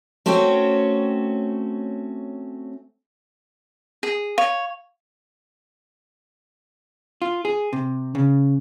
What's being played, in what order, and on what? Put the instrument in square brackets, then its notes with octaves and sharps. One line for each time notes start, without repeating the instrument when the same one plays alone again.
[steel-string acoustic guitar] A3 C4 C#4 F#4 C#5 G5
[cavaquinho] G#4
[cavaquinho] C#5 [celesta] F5
[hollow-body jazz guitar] F4
G#4
C3
C#3